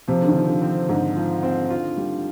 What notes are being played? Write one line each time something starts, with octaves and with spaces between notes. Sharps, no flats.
C3 F3
D3
D#3
F3
D3
C4
G#2 D3
F3
C4
F4
G3